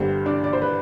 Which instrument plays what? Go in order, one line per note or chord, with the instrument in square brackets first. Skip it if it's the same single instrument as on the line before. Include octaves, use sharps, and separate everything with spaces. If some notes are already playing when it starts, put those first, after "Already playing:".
Already playing: [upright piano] G1 G2 D3 G3 C5
D4 D5
D5
C5
B4